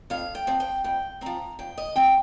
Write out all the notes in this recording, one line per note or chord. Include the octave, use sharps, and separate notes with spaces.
F2 F5
G5
F3 C4
G5
F2 G5
F3 C4 A#5
F2 G5
D#5
F3 C4 G5